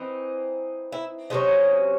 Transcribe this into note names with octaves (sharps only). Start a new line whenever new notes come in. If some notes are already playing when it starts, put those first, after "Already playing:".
Already playing: E3 C4 D#4
E4
C3 F#3 C#4 D#4